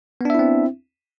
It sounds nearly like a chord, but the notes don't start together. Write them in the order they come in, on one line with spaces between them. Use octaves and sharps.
B3 D4 E5 E4 C4